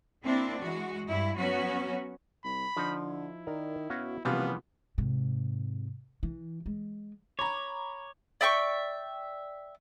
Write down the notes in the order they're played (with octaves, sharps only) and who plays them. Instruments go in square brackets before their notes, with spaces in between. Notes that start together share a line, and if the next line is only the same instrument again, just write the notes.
[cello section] A#3 C4 D4 E4
E3 G#3 F#4
G2 E4
F#3 B3 C#4 F#4
[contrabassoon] C2 [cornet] B5
[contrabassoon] D3 [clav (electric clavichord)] F3 D#4
[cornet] E4
[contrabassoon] D#3 [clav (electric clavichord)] A#4 D5
[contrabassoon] B2 [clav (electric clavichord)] C#4 F#4 F5
[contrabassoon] F#1 [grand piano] C3 F4 [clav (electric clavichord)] E3 F3 G3 [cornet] B3
[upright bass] G#2 C3
E3
G#3
[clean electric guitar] C#5 [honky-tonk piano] A#5 B5 D6
[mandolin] D5 E5 G5 C#6